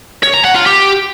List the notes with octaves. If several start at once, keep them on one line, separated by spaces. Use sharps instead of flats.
C#5
A#5
F#5
F4
G4